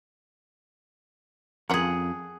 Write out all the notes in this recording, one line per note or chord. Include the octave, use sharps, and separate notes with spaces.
F2 C#4 F4 G#4 A#4 F#5